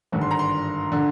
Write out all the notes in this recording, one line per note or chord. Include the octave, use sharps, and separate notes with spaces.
G#1 G2 D3
C6
A#5
C6
D3